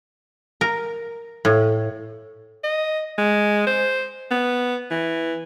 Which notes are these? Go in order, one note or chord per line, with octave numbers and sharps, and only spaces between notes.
A#4
A2
D#5
G#3
C5
B3
E3